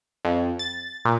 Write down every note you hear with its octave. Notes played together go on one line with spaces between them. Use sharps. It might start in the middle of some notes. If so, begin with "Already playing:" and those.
F2
A6
A#2